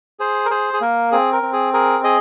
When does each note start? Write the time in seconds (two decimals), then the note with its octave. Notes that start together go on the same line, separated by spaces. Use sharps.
0.19 G#4 C5
0.46 A#4
0.51 G#4 C5
0.73 G#4
0.81 A#3 A#4
1.12 C4 G#4
1.32 A#4
1.43 C4
1.53 G#4
1.73 G#4 A#4
2.04 G#4 D#5